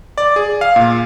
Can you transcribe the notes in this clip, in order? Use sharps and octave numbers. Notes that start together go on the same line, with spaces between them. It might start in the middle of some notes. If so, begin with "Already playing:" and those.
D5
G#4
F5
A#2